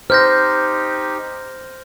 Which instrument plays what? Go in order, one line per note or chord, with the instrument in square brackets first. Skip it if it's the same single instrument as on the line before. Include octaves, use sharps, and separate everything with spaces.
[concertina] D#4 G4 [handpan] C5 [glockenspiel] F6 G6 A#6